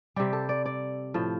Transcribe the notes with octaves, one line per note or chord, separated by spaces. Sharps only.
C3 G3 G4
A4
D5
D5
A2 F3